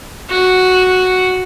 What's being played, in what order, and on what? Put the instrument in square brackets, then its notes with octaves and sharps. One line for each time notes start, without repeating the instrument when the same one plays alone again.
[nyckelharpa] F#4